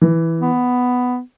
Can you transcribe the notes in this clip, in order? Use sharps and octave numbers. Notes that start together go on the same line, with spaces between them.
E3
B3